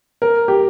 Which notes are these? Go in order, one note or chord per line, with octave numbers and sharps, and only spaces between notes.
A#4
G4